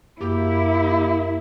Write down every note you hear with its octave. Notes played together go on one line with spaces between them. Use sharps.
F#2 A#3 E4 G4 D6